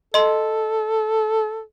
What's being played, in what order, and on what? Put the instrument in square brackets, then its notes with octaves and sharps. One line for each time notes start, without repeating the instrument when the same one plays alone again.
[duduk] A4 [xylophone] D#5 C6